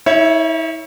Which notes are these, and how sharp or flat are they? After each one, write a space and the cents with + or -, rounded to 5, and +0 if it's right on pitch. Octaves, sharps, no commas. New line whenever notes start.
E4 -45 C#5 +0 E5 +10